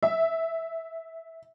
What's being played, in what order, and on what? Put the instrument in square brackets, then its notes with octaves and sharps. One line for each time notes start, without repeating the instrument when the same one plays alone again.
[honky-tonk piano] E5